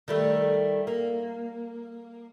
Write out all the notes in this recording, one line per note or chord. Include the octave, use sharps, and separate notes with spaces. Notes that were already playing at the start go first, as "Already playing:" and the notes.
D#3 G3 A3
A#3